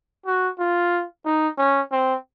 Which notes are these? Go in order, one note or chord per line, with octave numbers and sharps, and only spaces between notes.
F#4
F4
D#4
C#4
C4